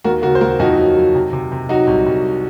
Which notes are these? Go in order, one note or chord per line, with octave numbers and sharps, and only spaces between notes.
D#2 F#4 A#4
C#3 F#4 A#4
C5
D#2 F#4 A#4
F2 D#4 F#4
F#3
F#3
C3
C3
C3
F#3 D#4 F#4
C2
C2